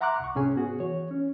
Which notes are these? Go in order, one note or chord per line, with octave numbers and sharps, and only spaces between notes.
E5 F#5 A#5 C6 D6 F#6
C2 C#6
G#2 C3 C#4 G#4 G#5
B3 F#4 G#4
E3 C#5
C#4